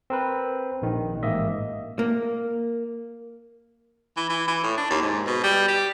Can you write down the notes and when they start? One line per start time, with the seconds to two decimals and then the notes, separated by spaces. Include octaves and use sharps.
0.10 C4 A#4 B4
0.82 A#1 D#3
1.23 A1 G#2 A#3 D#5 E5
1.99 A#3
4.16 E3
4.29 E3
4.47 E3
4.63 A2
4.77 D4
4.90 D#2
5.02 G#2
5.27 B2
5.43 G3
5.68 G4